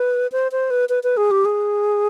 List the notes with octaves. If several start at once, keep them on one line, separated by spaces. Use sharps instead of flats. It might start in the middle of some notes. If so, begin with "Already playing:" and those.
Already playing: B4
C5
C5
B4
B4
B4
G#4
G4
G#4